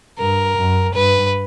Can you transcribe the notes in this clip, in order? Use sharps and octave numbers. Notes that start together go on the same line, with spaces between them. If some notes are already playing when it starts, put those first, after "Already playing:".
G2 A#4
F#2
G2 B4